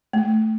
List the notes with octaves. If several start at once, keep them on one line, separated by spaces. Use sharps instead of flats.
A3